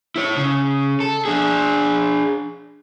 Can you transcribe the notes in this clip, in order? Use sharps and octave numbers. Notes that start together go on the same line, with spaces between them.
E4 C#5
C#3
A4
D4 G#4